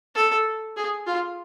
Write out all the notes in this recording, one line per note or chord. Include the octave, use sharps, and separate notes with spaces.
A4
G#4
F4